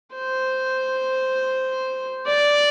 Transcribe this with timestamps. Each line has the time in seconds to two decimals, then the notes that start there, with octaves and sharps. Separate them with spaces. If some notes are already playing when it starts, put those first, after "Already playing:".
0.15 C5
2.27 D5